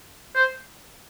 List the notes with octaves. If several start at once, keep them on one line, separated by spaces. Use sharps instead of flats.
C5